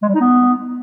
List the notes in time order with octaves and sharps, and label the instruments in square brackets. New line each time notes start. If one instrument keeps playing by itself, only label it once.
[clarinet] G#3
G3
D#4
B3